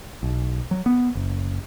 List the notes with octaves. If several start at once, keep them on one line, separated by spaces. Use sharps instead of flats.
B1
F#3
B3
F#1